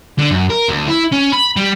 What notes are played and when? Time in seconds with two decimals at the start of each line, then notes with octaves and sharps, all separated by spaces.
0.19 D3
0.31 F#2
0.50 A#4
0.69 D2
0.88 E4
1.13 C#4
1.33 B5
1.57 G3